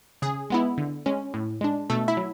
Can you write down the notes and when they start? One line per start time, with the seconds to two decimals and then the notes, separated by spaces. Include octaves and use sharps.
0.22 C#3 G#4
0.50 G#3 B3 E4
0.78 D3
1.06 G#3 C#4
1.34 A2
1.61 G#3 D4
1.90 B2 A3 A4
2.08 E4 E5
2.17 F#3